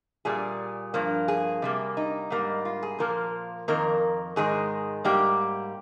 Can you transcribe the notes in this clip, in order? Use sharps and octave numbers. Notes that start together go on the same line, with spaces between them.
A#2 G3 G#4
G2 F3 A#3
G#4
C3 G3 A#3
D#4
G#2 G3 A#3
F4
G#4
A#2 F3 A#3 A#4
F2 D#3 A#3 A#4
G#2 D#3 G#3 G#4
G#2 G3 A#3 G4